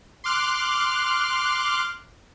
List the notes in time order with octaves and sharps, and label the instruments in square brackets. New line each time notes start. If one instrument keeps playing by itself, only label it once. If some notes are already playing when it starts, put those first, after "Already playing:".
[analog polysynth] C6 D6 F6 F#6